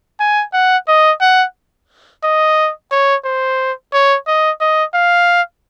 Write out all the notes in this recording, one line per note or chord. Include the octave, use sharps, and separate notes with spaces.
G#5
F#5
D#5
F#5
D#5
C#5
C5
C#5
D#5
D#5
F5